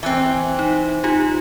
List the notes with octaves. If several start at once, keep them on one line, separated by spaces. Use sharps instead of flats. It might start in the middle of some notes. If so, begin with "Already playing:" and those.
E3 C4 E5 G#5 F#6
D#4
D#4 F4 G4